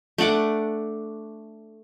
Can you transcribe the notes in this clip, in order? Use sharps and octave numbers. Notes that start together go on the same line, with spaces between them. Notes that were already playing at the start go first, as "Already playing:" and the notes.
A3 D4 F#5 D6